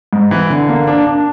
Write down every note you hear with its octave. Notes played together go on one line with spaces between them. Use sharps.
G#2
E3
D3
A#3
D4
D4